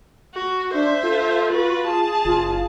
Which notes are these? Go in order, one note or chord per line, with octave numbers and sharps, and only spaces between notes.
F#4
D4 C5 E5
F4 A4
F#4 B4 A6
G#4 A5
F#1 F4